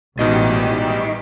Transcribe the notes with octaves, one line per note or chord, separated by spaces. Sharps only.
A1 G#2 B2 D#3 E3 G3 G4 D#5